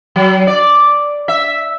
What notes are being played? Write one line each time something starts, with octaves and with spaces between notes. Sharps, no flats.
F#3
D5
E5